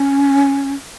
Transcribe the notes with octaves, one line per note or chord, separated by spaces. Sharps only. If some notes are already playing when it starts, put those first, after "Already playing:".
Already playing: C#4